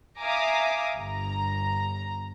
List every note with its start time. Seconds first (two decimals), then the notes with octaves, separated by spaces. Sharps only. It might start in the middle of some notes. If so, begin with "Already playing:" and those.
0.21 E5 F5 G#5 A#5 D6 D#6
0.95 G1 A#5